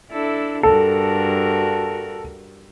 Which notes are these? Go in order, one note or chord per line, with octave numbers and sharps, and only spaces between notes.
D4 E4 A4
G2 F#4 A4 A#4